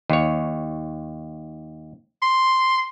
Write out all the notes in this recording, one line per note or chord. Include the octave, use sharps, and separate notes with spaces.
D#2 C#5
C6